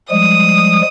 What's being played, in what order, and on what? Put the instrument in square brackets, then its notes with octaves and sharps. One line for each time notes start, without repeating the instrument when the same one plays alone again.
[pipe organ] F3 G3 G#3 [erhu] D#6